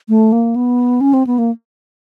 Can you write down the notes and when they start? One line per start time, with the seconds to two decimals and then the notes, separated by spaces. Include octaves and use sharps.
0.09 A3
0.32 A#3
0.56 B3
1.01 C#4
1.14 C4
1.27 B3
1.38 A#3